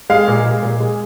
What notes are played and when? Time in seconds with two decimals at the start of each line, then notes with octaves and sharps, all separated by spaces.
0.10 G#3 F5
0.28 A#2
0.45 G#3
0.62 A#2
0.80 G#3